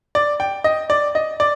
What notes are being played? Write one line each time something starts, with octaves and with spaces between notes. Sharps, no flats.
D5
G5
D#5
D5
D#5
D5